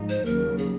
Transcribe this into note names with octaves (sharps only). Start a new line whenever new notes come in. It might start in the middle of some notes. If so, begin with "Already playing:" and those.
Already playing: G#2 F3 D#4
C5
D#2 C#3 F#3 A#4
G#4